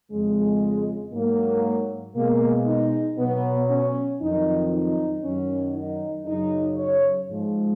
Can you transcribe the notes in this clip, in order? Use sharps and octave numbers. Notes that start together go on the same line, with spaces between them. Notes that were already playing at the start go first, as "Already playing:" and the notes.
F2 C#3 G#3
G#2 F#3 A#3
B2 G#3 A#3
D#4
B2 F#3 B3
C#4
F2 D#3 F#3 D#4
D#4
F#2 D#3 F#3 C#4
D#4
F#2 C#3 F#3 D#4
C#5
G#2 F3 G#3